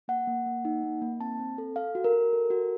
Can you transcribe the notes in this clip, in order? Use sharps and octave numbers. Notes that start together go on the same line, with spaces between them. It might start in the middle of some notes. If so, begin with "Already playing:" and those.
A#3 F#5
A#3
A#3
D#4
A#3
A#3
C4 A5
C4
A4
A4 F5
F#4
A#4
F#4
A4
F#4